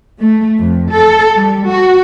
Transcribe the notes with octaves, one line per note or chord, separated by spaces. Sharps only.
A3
F2
A4
G3
F#4